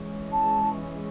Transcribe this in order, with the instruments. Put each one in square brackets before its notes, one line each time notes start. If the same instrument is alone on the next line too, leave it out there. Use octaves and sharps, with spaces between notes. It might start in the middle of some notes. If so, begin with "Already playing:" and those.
Already playing: [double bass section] E3 G#3 C#4
[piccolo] A5